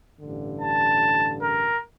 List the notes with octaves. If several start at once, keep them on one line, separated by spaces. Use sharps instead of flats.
A1 G2 D3
A5
A#4